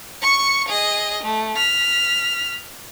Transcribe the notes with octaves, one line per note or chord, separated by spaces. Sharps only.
C#6 C#7
G#4 D#5
A3
F6 B6